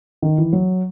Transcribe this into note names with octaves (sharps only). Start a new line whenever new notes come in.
D#3
E3
F#3